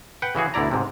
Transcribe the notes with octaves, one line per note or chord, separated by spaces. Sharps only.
B4 F#5 G5
C#3 E3 F#4 G#4
D2 B2 E4 D5 A#5
G#2 C3